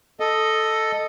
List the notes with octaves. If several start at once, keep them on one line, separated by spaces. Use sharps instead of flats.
A4 D#5